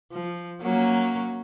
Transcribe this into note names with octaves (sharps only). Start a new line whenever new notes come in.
F3
F#3 A#3 C#4